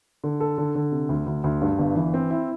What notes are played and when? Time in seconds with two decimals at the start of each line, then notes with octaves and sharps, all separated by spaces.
0.24 D3
0.40 A4
0.58 D3
0.75 D3
0.92 C3
1.09 D2
1.26 D2
1.44 D2
1.61 G2
1.79 G1
1.95 E3
2.14 C4
2.31 E4